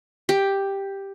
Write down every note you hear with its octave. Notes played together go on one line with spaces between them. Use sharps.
G4